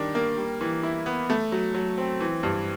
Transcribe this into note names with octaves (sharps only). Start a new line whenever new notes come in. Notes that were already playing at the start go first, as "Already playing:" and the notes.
Already playing: D#3 G3 D4
A#3
G3
E3
E4
B3
A3
F#3
F#3
C4
E3
G2